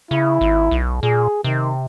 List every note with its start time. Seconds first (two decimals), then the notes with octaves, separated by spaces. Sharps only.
0.11 C#3 E4
0.41 G#1
0.71 B1
1.03 A#2 G#4
1.44 C3 D#3